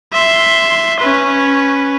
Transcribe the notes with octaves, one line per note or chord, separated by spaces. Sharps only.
E5 C6
C#4 B4